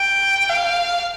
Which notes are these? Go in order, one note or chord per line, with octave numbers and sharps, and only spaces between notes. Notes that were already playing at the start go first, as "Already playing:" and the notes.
Already playing: G5
F5